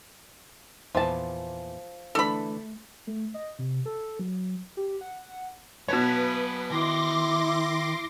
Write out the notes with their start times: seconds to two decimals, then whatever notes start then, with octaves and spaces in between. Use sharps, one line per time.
0.95 E2 A#2 F3 B4 A5
2.15 D3 E3 A3 D4 A4 B5
3.07 A3
3.34 D#5
3.59 C3
3.86 A4
4.19 F#3
4.77 G4
5.01 F#5
5.88 B2 F#3 B4 C#5 A5
6.71 D#3 E4 C6 D6 A#6